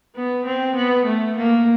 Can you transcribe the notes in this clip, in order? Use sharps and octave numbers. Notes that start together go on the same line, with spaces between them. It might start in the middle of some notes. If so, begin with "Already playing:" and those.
B3
C4
B3
A3
A#3